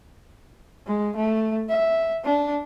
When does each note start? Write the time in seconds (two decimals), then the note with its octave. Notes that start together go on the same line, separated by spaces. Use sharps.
0.87 G#3
1.16 A3
1.69 E5
2.24 D4